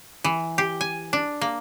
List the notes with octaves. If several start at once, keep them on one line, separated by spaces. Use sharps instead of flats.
E3
G4
G#5
D4
A#3